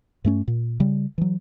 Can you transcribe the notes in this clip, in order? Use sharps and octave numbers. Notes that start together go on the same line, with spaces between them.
G2 A3 C#4
A#2
C#3 G3
E3 F#3